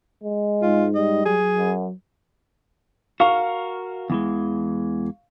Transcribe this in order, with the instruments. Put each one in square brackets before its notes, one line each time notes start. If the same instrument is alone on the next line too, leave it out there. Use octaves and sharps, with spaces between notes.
[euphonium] G#3
[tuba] G#2 [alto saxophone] F4
[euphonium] G3 [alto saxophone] D#5
[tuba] F#3 [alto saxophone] G#4
[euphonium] F#2
[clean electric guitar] F#4 A#4 [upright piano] F5 C#6
[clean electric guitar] E2 E3 G#3